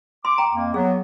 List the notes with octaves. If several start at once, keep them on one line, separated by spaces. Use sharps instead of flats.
C6 D6
G5 A#5
F2 A#3
F#3 B3 G#4